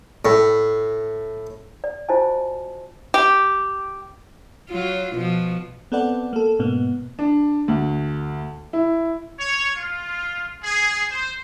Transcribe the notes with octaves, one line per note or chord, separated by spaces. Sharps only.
A2
D5
F4 F#4 C5 D#5 G#5 A5
G4
F#3 F4
B2 F3
B3 C4 A4 B4 D5 F#5
A#3 A4
G#2 B2 A#3 B3
D4
D2
E4
C#5
F4
G#4
C5